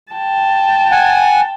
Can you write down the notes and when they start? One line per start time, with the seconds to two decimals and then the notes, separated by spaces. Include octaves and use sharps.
0.13 G5 A5
0.91 F#5 G#5